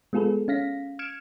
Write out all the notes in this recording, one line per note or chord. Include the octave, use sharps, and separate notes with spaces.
G#3 B3 F4 G#4 A4 B4
C#4 F5 A#6 B6
F6 G#6 C#7 D7 E7